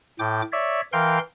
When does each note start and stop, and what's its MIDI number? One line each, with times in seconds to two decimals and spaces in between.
0.19 0.42 45
0.19 0.42 79
0.19 0.42 86
0.52 0.81 73
0.52 0.81 74
0.52 0.81 76
0.93 1.19 52
0.93 1.19 70
0.93 1.19 77
0.93 1.19 79
0.93 1.19 84